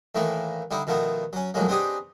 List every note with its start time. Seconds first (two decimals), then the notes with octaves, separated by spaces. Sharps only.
0.15 A2 D#3 E3 A3 A#3
0.71 D3 G3 D#4 E4
0.87 B2 D#3 F3 A3 B3
1.33 F#3 C#4
1.54 B1 F2 A2 F#3 G#3 A#3
1.68 B3 C4 D4 D#4 G4 G#4